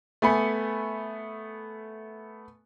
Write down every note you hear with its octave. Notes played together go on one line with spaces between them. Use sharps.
A3 B3 G#5 B5 C#7